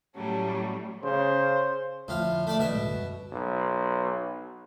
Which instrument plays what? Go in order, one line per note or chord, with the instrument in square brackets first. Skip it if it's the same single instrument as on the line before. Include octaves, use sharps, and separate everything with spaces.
[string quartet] A2 F#3 G3 A3 C#4
[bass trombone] C#3 [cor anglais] C5
[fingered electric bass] F2 D3 F3 [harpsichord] A2 F4
[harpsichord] A3 D5
[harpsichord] B2 E5 [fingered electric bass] D3
[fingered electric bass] D2 A2 G#3
F#2 G3
[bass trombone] B1